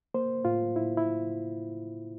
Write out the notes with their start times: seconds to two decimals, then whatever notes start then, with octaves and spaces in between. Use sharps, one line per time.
0.14 A#3 C5
0.45 A2 F4
0.76 A2 E4
0.97 E4